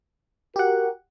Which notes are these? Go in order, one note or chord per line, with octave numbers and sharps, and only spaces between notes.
F#4 G4 A#4 F#5